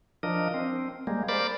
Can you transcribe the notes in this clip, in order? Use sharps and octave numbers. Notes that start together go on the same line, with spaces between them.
F3 D4 A#4 D#5
C4
G3 G#3 A#3
A#4 C5 D5 B5 D6 A6